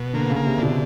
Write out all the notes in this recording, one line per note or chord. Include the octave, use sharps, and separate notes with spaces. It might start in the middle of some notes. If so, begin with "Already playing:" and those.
Already playing: B2
D3 A#3
C#3
A#3
C3
B2 D3